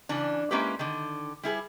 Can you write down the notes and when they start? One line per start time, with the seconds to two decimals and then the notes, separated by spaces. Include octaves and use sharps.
0.09 C#3 E3 D4
0.51 G#3 A#3 C#4 E4 G4 B4
0.79 D3 D#3
1.43 G3 E4 G#4 B4